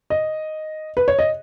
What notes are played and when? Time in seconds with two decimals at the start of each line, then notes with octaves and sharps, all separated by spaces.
0.10 D#5
0.97 B4
1.08 C#5
1.19 D#5